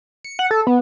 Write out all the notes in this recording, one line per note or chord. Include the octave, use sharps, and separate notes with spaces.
C#7
F#5
A4
B3